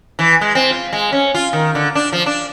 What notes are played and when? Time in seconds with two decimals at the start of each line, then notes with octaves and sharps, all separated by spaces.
0.19 E3
0.41 G#3
0.55 C4
0.70 F4
0.93 G#3
1.12 C#4
1.35 F4
1.53 D#3
1.75 D3
1.95 D4
2.12 F3
2.26 D4